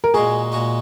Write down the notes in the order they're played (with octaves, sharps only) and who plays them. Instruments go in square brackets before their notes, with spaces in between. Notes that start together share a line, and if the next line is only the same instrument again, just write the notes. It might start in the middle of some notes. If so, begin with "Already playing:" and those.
[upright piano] A#4
[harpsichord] A#2 G#3 F#4 D#5 [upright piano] G#4
[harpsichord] A#2 G#3 F#4 D#5